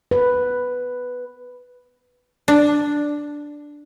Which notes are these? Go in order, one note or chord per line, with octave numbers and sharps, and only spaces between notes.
B4
D4